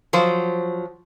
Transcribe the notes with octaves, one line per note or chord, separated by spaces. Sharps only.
F3 F#3 C5